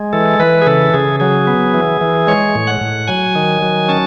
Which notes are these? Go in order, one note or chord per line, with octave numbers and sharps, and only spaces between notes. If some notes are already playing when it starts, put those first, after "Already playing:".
Already playing: G#3
E3 A4
E3 B4
G#4
C#3 A4
C#3 G#4
F#3 G#4
B3
E3
E3
G#3 C#5
A2
F#5
A2
F#3 G#5
D#3
F#3
C#4 A5